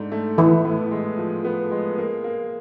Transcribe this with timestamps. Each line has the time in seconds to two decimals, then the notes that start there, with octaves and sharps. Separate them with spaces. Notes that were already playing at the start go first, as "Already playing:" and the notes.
Already playing: G#2 A3 D4
0.12 A3
0.38 E3 B3 E4
0.65 A2
0.91 G#3
1.18 F3
1.45 B3
1.71 G#3
1.98 A#3
2.24 A#3